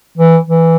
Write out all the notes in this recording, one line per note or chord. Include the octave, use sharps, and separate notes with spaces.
E3
E3